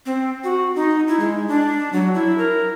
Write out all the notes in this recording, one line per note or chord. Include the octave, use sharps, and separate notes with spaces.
C4
F#4
D#4
E4
G#3
D4
F#3
E4
A#4